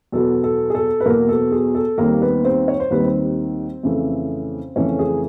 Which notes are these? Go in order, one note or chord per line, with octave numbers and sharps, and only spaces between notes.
E2 B2 F#3 B3 A4
A4
G#4
A4
B4
E2 B2 F#3 A#3 B3 A#4
A4
G#4
A4
D#2 D#3 G3 A#3 C4 A#4
B3 B4
C4 C5
C#5
C5
D#2 D#3 G3 C4 B4
C4 C5
F2 C#3 E3 A3
F2 C#3 E3 A3 C#4 C#5
G#4